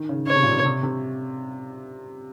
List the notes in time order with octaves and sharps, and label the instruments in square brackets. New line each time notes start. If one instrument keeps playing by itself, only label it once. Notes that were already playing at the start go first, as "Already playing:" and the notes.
Already playing: [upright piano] D#3
C#3
[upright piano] C#3 [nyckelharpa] C#5
[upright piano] C3
A#2
C3
C3
C3